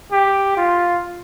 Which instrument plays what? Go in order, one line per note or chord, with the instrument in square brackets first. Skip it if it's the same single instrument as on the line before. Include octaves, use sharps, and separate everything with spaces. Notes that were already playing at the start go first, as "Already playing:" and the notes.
[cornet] G4
F4